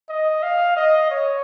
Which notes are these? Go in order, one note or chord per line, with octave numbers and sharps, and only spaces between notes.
D#5
F5
D#5
C#5